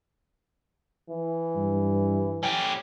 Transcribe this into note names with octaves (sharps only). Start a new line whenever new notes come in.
E3
G2
C#4 G4